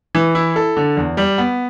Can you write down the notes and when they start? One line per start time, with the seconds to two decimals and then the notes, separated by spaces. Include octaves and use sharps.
0.15 E3
0.35 E4
0.56 A4
0.77 D3
0.97 E2
1.17 G3
1.38 B3